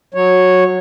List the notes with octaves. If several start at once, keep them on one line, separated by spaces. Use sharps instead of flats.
F#3 C#5